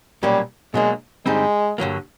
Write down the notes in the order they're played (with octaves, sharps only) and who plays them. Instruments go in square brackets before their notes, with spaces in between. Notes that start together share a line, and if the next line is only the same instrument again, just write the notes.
[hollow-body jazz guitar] B1 A#2 F#3 A#3 C#4 [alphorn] G3
[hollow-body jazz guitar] B2 F#3 A#3 D4 [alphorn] G#3
[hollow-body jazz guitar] G2 D3 G3 C4 D#4 [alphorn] G#3
[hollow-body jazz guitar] G2 D3 F#3 A#3